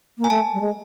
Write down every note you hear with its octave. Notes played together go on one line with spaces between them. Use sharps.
A#3
G#5
A3 A5
G3
G#3